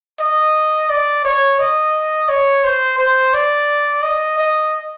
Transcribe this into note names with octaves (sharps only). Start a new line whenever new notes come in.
D#5
D5
C#5
D#5
C#5
C5
C5
D5
D#5
D#5